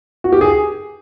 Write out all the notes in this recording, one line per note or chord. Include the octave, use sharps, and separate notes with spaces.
F#4
G4
G#4